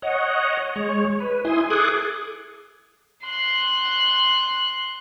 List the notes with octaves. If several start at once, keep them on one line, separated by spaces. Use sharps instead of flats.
C#5 D#5 F#5
G#3 C#5
B4
E4 G#5 C6 D#6
G#4 A4 D6 D#6 F#6 G#6
C6 F#6